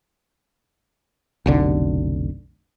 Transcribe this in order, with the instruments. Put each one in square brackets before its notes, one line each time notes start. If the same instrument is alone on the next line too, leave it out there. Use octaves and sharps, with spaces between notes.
[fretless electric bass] F1 B1 D3